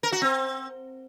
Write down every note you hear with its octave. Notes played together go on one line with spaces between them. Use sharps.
A#4
F#4
C4